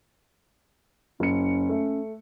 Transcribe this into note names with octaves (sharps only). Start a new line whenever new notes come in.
F#1 C#4 C#7
A3